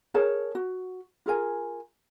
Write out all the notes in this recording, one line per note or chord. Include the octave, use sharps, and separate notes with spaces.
G#4 A#4 C#5 A5
F#4
F4 G#4 A#4 G#5